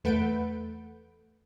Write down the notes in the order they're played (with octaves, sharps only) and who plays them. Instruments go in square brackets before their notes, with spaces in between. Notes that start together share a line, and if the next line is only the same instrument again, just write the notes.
[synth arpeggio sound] E2 A3 B4 F#5 G6 D7